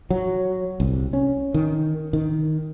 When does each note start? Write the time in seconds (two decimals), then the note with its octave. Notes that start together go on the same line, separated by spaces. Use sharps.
0.10 F#3
0.80 C2
1.13 C#4
1.54 D#3
2.13 D#3